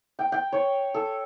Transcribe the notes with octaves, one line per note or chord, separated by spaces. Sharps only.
G5
G5
C#5
A4